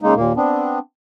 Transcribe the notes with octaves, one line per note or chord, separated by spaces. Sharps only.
C#3 G#3 A#3 D#4
D#2 A#2 A#3
B3 C4 D4